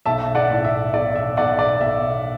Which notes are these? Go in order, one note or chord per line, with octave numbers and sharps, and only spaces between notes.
B1 E5 A5
D5 F#5
A2
E5
B1 D5
E5
B1 D5 F#5
D5
B1 E5